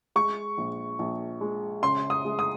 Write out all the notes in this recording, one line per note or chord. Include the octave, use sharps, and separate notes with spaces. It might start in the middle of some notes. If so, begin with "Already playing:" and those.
G#3 C#6
A#1
A#1
G#3
C#3 C6
D#6
G#3
D#6